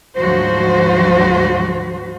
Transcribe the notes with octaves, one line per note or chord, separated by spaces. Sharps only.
D2 G#2 F3 F#3 F#4 C5